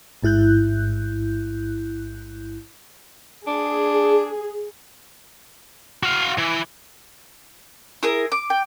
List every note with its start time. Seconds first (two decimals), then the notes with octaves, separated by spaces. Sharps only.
0.22 A1 G#2 E4 F#6 G6
3.47 D4 G#4
6.03 F#4 F5
6.38 E3
8.03 E4 G#4 A#4
8.32 D6
8.50 G5